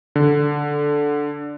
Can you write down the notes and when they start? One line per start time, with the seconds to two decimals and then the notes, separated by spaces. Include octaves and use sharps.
0.16 D3